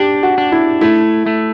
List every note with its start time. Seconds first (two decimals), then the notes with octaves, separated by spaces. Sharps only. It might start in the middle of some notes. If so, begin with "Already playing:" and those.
Already playing: D4 G4
0.23 F#4
0.38 D4
0.52 E4
0.81 A3 E4
1.26 A3